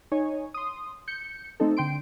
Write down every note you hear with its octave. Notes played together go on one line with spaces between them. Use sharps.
D#4 C#5 G#5
C6 D#6
G6 C#7
A3 C4 D#4 A4
D3 G5 C6 D7